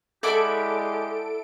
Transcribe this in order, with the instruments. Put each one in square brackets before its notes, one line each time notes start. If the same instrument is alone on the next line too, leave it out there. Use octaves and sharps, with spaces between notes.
[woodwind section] G#3 G4 [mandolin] E4 D5 F#5 [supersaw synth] A4 D7